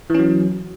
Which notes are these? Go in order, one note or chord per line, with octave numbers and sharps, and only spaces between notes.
E3 F#3 C#4